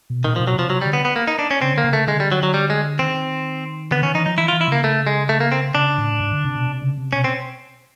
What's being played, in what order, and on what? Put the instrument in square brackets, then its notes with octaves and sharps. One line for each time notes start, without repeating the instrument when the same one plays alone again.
[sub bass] B2
[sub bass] A#2 [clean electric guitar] D#3
[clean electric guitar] F3
[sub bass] B2
[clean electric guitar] F#3
[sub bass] C3 [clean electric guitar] F3
[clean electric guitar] F#3
G3
[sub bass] D3
[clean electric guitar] B3
B3
A#3
D#4
D4
C#4
[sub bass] C#3 [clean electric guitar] C4
[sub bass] D3 [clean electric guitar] A#3
[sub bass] C#3
[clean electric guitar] A3
[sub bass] D3 [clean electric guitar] G#3
[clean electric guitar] G3
F#3
F#3
G3
G#3
[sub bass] D#3 [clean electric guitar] C4
[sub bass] D3 [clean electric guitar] B3
[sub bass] D#3 [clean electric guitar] C#4
[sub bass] E3 [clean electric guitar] D#4
[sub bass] F3 [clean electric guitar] D#4
[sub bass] E3 [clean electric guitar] E4
[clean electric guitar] F4
[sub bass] E3
[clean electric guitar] E4
[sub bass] C#3 [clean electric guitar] A#3
[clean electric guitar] A3
G#3
A3
A#3
C4
[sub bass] C#3 [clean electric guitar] D4
[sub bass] A2
G#2
D3
C3
B2
C3
C#3
C3
[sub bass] B2 [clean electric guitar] C#4
[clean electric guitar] C4